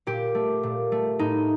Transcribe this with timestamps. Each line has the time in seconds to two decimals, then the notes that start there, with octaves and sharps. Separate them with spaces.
0.07 A#2 G4
0.35 A3
0.63 A#2
0.92 A3
1.19 A2 D#4